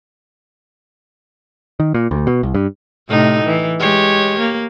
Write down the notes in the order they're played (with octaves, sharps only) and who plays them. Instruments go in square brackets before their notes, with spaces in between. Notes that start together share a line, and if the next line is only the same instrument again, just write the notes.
[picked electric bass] D#3
A#2
D2
B2
C2
G2
[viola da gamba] A2 C3 D#4
E3
G#3 G4 C#5
A#3